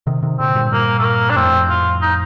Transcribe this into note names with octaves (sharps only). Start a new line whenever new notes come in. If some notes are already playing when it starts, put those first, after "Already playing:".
C3 D#3
C3 D#3
A#2 D3 C4
G2 A#2
G2 A#2 A#3
A3
A#3
D4
F2 A2 C4
F4
D#4